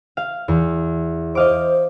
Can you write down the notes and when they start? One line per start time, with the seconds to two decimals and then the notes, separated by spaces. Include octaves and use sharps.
0.17 F5
0.48 E2
1.35 C5 D#5 F5 D6